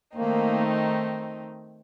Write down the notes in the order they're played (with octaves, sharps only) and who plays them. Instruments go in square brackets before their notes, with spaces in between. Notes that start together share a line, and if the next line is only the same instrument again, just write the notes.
[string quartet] D#3 A3 C4 D#4 [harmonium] A#3